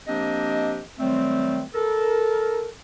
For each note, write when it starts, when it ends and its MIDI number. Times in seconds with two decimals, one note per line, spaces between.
0.08 0.80 53
0.08 0.80 58
0.08 0.80 60
0.08 0.80 62
0.08 0.80 67
0.08 0.80 75
1.00 1.62 51
1.00 1.62 54
1.00 1.62 55
1.00 1.62 57
1.00 1.62 60
1.74 2.68 69
1.74 2.68 70